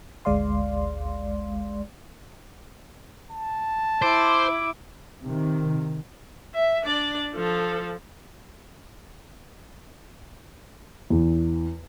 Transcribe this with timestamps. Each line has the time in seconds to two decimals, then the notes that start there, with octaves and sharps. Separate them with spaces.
0.25 G#1 D2 G#3 D5 F5 C6
3.31 A5
4.02 E4 C5 D6
5.22 C3 D#3
6.54 E5
6.83 D4 D5
7.35 F3 A4
11.10 E2